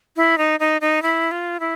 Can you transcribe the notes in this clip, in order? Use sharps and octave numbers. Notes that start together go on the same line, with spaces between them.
E4
D#4
D#4
D#4
E4
F4
E4